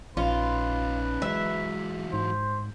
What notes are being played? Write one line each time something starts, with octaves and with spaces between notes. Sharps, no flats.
A#1 C#4 D#4 F4 B4
E3 F#3 G#3 E5
G#2 C5